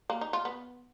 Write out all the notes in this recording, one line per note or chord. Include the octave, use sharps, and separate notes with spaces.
A#3
D#4
F4
B3